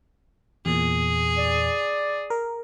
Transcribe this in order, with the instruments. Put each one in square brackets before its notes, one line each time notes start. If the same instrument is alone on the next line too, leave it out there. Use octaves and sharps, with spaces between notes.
[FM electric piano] E2 A#2 [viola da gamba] G#4
[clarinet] D5
[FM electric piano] A#4